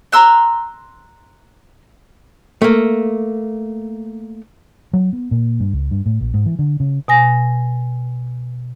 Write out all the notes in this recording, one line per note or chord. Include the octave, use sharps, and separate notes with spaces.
A#5 C6 E6 F#6
A3 A#3
F#3
B3
A#2
G2
C#2
G2
A2
A#1
G#2
E3
D3
C#3
B2 G#5 A#6